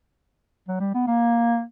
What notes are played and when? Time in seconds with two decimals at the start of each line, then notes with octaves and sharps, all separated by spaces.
0.68 F#3
0.80 G3
0.94 B3
1.08 A#3